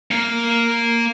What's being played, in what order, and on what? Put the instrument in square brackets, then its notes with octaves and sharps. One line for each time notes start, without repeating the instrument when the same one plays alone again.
[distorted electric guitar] A#3 F5